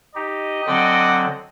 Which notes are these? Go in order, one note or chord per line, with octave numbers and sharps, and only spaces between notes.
D#4 G4 D#5
D3 F#3 C4 F#4 D5 G5